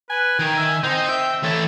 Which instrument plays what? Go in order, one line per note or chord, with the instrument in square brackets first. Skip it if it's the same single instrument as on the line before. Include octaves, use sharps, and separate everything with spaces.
[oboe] B4 [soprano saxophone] G#5
[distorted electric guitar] D#3 [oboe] G5
[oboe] E5
[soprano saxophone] C4 [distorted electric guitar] D#4 [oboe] C5
[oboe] E5 [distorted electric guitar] G5
[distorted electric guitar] E3 A4 [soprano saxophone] C#5